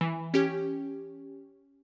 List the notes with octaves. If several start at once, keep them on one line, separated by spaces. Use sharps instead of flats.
E3
C#4 G4